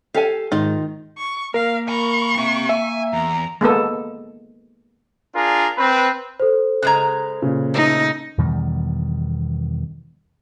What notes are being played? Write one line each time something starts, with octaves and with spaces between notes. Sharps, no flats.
G4 A4 F5 G#5
G#2 D#3 D#4 F4
C#6
A#3 A#4 F5
G#5 B5 C#6
C4 E5
A#3 E5 G#5
E2 A#5
G#3 A#3 B3 A4
D4 F4 G#4 A#4
C4 B4
A4 C5
C#3 G#3 A#5 F#6 G#6
A#2 C#3
A3 D#4
E2 B2 D#3 G3